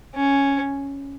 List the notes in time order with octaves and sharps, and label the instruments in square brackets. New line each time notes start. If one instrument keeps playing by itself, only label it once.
[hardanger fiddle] C#4